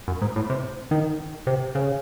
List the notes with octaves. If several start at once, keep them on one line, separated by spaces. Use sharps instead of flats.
F#2
G#2
A2
C3
D#3
C3
C#3